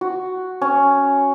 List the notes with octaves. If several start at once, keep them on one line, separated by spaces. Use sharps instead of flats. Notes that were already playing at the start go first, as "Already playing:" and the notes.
F#4
C#4